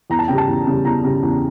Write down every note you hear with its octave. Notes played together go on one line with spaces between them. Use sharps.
E2 A#5
A5
C#3 G3 G5
A5
E2
C#3 G3
E2 A#5
C#3 G3
E2